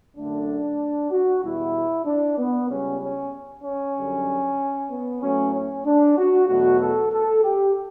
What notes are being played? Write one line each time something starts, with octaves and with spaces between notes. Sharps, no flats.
F#2 D3 A3 D4
F#4
E2 B2 G3 E4
D4
B3
C#2 C#3 G3 C#4
C#4
C#4
F#2 D3 G3
B3
A2 F#3 A3 C#4
C#4
D4
F#4
E2 B2 F#3 A3 F#4
A4
A4
G4